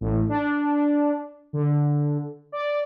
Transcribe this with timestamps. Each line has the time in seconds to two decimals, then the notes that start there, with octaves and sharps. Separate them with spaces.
0.01 A1
0.29 D4
1.53 D3
2.52 D5